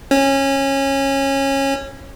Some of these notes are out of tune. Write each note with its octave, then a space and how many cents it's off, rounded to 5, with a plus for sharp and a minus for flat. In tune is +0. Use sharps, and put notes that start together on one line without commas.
C#4 -20